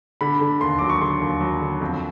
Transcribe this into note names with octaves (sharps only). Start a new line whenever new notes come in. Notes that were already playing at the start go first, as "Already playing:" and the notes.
D3 B5
D3
D#2 C6
F#3 D6
C#6
D3 C6
D#2
F#3
D3
F2